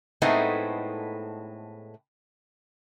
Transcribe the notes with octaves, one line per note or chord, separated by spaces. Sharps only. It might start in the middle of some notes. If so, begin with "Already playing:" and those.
A2 G#3 A3 B3 C4 D#4